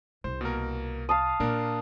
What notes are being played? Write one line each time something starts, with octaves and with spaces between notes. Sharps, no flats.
C2 C5
B2 A#3 A#4
F5 A5 D#6
A#2 A#3 D4 A#4